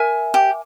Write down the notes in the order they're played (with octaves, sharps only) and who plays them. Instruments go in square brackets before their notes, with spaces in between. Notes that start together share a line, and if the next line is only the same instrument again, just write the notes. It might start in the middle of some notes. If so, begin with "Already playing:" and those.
Already playing: [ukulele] A#4 E5 G#5
[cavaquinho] G4